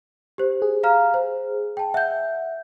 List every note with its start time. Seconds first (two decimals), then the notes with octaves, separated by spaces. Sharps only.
0.38 G4 C5
0.62 G#4
0.83 F5 A#5 F6
1.14 C5
1.77 G5 A5
1.94 E5 F#5 G6